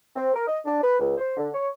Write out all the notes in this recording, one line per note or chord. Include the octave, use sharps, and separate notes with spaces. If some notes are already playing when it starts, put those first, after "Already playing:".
C4
A#4
D#5
D4
B4
C#2
C5
D3
C#5